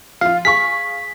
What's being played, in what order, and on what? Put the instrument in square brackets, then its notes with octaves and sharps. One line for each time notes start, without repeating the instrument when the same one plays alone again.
[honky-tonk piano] F3 F4 [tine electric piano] F5
[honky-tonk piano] G#4 F5 C#6 [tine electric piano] B6